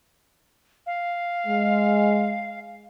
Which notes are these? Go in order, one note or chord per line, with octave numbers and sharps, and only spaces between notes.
F5
G#3